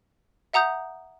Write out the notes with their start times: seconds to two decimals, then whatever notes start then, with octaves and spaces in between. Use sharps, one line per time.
0.53 E5 F#5 A#5 D#6 G6